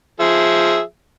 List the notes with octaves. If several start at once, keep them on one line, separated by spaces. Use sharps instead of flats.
F3 G#4 E5